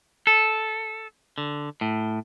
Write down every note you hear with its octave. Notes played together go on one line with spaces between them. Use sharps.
A4
D3
A2